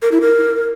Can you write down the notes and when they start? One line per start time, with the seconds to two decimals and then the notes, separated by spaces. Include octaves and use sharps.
0.02 A#4
0.12 E4
0.21 A#4